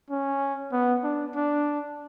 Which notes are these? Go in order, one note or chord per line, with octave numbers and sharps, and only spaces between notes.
C#4
B3
D4
D4